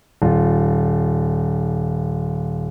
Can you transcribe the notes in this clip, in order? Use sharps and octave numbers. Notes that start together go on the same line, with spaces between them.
D#1 F4